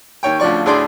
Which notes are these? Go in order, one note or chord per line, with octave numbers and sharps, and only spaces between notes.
D#2 C#5 G5
D2 C#3 F3 D5 C#6
D2 A2 G#4 D5 C6 D6